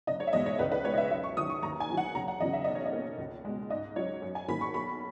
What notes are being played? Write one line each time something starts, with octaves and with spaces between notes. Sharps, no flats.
F#1 D#5
C#5
E5
E2 B2 G#3 D#5
C#5
C#2 B4
B4
B2 G#3 B3 C#5
D#5
E5
F#2 E5
C#6
D#3 F#3 D#6
C#6
D#2 A#5
G#5
D#3 F#3
F#5
F#1 A#5
F#5
E2 C#3 F#3 C#4 D#5
E5
B1 D#5
C#5
D#5
B2 A#3 C#4
C#2
B2 G#3
G#2 D#5
F#3 C#4 C#5
F#2
G#5
D#3 F#3 A#3 B5
C#6
B1 B5